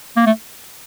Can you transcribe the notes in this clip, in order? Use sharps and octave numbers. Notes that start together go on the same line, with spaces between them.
A#3
A3